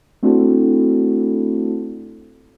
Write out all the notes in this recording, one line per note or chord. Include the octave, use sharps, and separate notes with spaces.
A3 C4 D4 E4 F#4 A4